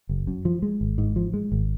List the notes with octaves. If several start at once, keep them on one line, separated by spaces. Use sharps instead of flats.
F#1
F#2
F3
G#3
G#1
G#2
F3
G#3
G#1